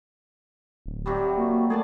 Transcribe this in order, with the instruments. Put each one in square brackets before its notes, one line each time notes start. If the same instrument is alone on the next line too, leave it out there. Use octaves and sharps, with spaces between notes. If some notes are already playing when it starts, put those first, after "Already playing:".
[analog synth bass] D1
[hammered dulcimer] C3 F#3 G3 [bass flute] G4
[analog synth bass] A#3 [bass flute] F#4
[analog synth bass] A3 [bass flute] A#3 [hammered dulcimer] G#4 D5 A5